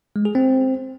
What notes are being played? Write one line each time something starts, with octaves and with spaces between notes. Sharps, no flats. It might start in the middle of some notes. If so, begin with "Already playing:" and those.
G#3
G#4
C4